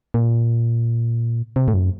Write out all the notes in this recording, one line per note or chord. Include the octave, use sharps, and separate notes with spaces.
A#2
C3
A2
F#2